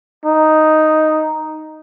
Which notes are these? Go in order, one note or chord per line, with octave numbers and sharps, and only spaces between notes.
D#4